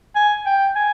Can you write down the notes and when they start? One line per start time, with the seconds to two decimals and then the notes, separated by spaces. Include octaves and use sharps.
0.15 G#5
0.46 G5
0.75 G#5